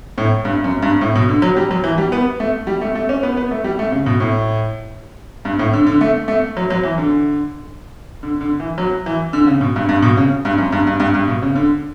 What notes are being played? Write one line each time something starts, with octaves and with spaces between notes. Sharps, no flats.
A2
G2
F#2
G2
A2
B2
D3
F#3
G3
F#3
E3
G3
B3
A3
G3
A3
A3
C#4
B3
B3
A3
G3
A3
C#3
B2
A2
G2
A2
D3
D3
A3
A3
F#3
F#3
E3
D3
D3
D3
E3
F#3
E3
D3
C#3
B2
G2
G2
B2
C#3
G2
F#2
G2
G2
G2
G2
B2
C#3
D3